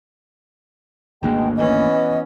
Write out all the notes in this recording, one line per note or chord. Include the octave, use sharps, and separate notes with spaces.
G#1 D2 B2 G#3 A#3 G5
E3 B3 C#4 D#5